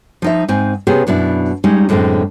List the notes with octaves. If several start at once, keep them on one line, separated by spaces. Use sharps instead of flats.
F3 D#4 E5
G#2 C4 G#5
C3 B3 C#4 G4 G#4
F#2 B2 D4 E4
G3 G#3 C#4 D#4
F#2 A2 D3 G#3 C4